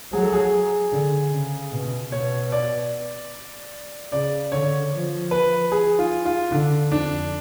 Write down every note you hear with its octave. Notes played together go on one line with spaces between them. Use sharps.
F#3 G#4
A4
G#4
D3
C#3
B2
B2 C#5
D5
C#3 D5
D3 C#5
F3
B4
G#4
F4
F4
D3 D4
F2 D4